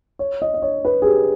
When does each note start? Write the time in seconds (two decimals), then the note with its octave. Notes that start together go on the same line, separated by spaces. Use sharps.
0.19 C#5
0.42 D#5
0.54 D#5
0.62 C#5
0.85 B4
1.02 G#4
1.06 G4